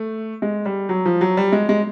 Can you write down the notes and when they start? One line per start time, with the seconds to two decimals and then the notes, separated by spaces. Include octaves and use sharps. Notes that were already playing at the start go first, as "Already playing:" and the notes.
Already playing: A3
0.42 G#3
0.65 G3
0.89 F#3
1.06 F3
1.21 F#3
1.37 G3
1.52 G#3
1.69 G#3